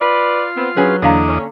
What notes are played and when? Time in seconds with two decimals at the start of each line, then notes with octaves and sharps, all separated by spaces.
0.01 F4 B4 D5 C6
0.57 B3 C4
0.76 F#3 C#4 G#4 B4
1.02 E2 D3 A#3 D4 D#5 A#5
1.28 C#4